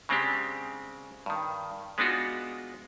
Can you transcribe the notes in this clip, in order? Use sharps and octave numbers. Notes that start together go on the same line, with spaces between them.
C#3 G#3 C4 D4 G4
G2 D#3
G#3 B3 D4 D#4 F4 F#4